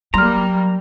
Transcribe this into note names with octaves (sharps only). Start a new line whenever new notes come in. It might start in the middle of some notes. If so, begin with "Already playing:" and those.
F#3 G3 A#3 A#5 C6 F6